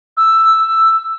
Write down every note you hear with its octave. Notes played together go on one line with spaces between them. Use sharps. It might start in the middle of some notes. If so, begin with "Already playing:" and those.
E6